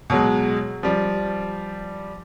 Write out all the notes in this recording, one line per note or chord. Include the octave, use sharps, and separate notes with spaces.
B2 F#3 G#3
F3 G3